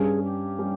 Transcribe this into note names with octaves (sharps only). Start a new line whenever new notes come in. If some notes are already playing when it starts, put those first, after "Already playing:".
Already playing: G2 G3 C#4 G#4
G4
G3 C#4